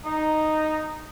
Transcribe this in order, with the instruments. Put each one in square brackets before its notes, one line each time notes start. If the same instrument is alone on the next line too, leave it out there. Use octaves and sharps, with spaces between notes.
[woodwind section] D#4